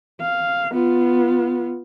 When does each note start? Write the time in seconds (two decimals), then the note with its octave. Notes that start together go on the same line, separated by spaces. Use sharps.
0.21 F5
0.72 B3 F4